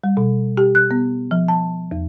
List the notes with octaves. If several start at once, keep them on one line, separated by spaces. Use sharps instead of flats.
G3
B2
G4
F#6
B3
F3
A5
E2